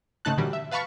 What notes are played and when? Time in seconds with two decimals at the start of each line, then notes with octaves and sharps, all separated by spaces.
0.25 G#2 C#3 A3 D#4 A5 F#6
0.37 A#2 D3 E3 F#3 G3
0.53 E5
0.71 B4 F5 A5 B5 C#6